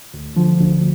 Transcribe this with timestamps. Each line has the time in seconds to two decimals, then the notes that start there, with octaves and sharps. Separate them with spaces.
0.14 D2
0.36 D3 F3
0.60 D2